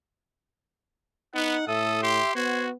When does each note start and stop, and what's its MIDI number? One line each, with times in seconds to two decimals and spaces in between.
1.35 1.56 59
1.35 1.66 63
1.35 1.67 78
1.68 2.20 45
1.68 2.02 69
1.68 2.35 76
1.68 2.00 87
2.02 2.32 67
2.02 2.32 84
2.35 2.74 59
2.35 2.69 66
2.35 2.64 72
2.35 2.63 92